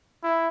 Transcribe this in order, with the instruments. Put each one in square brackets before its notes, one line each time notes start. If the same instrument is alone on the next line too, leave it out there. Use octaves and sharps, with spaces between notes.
[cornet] E4